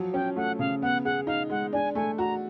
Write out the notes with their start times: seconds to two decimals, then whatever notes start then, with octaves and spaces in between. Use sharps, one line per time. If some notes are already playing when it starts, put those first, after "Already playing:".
Already playing: F3 F#3
0.14 C#4 G5
0.36 A3 F#5
0.59 C#3 F5
0.82 B3 F#5
1.04 G#4 F#5
1.27 D#4 F5
1.50 G#3 F#5
1.73 D4 G#5
1.95 A3 G#5
2.18 F#4 A#5